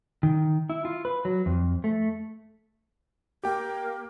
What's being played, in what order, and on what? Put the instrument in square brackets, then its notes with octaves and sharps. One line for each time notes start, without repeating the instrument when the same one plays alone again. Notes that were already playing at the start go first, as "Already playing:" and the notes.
[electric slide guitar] D#3
E4
F4
B4
F#3
F2
A3
[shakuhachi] A#3 [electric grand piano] G4 G5